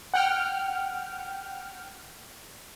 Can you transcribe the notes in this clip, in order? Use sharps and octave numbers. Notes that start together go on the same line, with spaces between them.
F#5 G5 F6